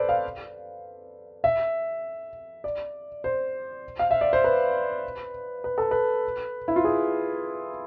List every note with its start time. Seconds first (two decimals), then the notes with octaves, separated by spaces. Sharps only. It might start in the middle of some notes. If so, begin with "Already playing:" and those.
Already playing: A4 B4 C5 D5
0.09 F5
1.44 E5
2.64 D5
3.24 C5
3.99 F5
4.11 E5
4.21 D5
4.33 C5
4.44 B4
5.64 B4
5.78 A4
5.91 B4
6.68 E4
6.76 F4
6.84 G#4